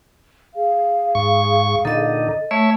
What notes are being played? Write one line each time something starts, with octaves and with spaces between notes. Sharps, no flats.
G#4 F5
G#2 C#6
A#2 D3 D#4 A4 D#5
A3 C#5 E5